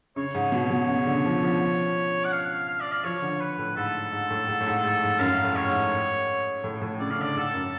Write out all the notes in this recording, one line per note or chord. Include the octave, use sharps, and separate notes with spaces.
C#3 C#5
G#2
B2
B2
C#3
D3
F3
F3
F#5
F5
F5
D5
F5
F3 C#5
D3
B4
A2
G#2 A4
G#2
A2
G#2
A2
G#2
G#2
G#2
F#2 F5
A2
C#5
G#2
A2
A2
C#3 D5
F5
D3
D5
G#2 A4
F#2